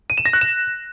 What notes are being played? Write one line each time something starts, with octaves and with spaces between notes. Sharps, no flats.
D#7
E7
A#6
F#6
E7